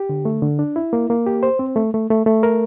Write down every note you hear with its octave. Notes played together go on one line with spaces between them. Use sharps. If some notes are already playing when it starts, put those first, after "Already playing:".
Already playing: G4
D3
A3
D3
D4
E4
A#3
A#3
G4
C5
C4
A3
A3
A3
A3
A#4